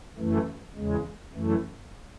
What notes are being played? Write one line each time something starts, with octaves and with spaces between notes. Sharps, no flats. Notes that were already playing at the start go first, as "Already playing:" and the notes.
F#2 E3 A3
E2 C#3 G#3
F#2 E3 A3